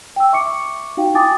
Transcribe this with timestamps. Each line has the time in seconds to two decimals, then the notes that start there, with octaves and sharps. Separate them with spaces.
0.16 G5 E6
0.32 E5 C#6 D6 C#7
0.97 D#4 F#4 F5 G5
1.15 E4 G5 G#5 D6 D#6 A6